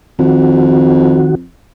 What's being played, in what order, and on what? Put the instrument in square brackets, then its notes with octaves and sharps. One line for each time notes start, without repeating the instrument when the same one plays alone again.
[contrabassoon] F2 [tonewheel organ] D#3 F#4